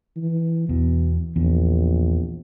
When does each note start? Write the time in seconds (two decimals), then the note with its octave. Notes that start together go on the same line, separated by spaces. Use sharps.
0.16 E3
0.69 E2 B2
1.36 A#1 E2